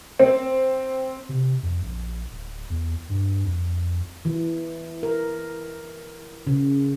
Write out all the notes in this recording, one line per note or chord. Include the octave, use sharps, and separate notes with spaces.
C4
C3
F2
A#1
D1
E2
G2
F2
E3
A#4
C#3